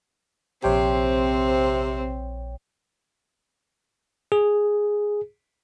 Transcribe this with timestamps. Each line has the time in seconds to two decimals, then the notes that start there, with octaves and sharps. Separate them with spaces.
0.64 A#1 C3 C4 C#5 G5
4.32 G#4